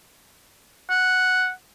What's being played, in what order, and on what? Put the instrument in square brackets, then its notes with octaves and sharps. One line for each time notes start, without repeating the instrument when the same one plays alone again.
[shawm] F#5